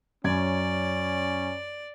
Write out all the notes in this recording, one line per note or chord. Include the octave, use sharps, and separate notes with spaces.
F#2 C#4 D5 G#6